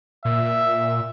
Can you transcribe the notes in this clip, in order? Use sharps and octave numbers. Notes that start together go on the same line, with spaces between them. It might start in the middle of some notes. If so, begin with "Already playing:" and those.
A#2 E5